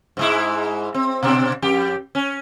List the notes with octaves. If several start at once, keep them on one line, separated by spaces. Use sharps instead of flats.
G#2 G#3 E4
C4
B2 C4 D4
F2 G4
C#4